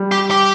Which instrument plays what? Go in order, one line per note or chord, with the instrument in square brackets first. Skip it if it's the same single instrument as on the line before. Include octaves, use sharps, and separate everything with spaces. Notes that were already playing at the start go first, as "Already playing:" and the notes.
Already playing: [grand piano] G3
[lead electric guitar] G4
G4